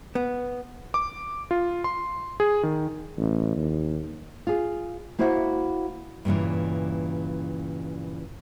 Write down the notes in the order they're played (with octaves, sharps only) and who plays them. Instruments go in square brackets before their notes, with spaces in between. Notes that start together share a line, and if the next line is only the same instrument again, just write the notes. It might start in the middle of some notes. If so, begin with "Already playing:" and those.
[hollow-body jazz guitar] B3
[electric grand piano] D6
F4
C6
G#4
D#3
[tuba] A1
D#2
[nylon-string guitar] F4 G#4
A#3 E4 F#4 C5 E5 F#5
G2 A#2 C#3 E3